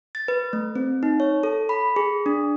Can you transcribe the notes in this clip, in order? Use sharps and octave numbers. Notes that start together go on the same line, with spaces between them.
A6
B4
A3
C4
D#4
C#5
A4
B5
G#4
D4